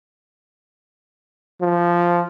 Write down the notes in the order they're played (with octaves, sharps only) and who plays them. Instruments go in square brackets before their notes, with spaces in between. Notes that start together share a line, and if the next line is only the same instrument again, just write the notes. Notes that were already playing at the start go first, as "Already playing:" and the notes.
[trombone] F3